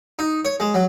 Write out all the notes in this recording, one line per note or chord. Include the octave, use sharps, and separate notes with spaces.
D#4
C#5
G#3
F#3